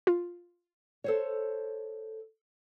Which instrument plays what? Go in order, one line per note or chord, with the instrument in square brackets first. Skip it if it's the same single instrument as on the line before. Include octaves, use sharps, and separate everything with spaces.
[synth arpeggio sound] F4
[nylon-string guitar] A4 C5 C#5